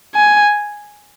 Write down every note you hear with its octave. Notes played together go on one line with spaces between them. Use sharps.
G#5